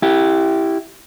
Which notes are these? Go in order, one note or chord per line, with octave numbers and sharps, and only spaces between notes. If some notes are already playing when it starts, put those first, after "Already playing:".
E4 G4